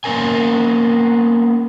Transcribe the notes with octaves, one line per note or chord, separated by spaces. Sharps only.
A#3 B3 C#4 A#4 G#5